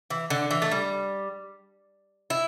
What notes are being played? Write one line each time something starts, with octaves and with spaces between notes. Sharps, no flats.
E3
D3
E3
A3
G3
E4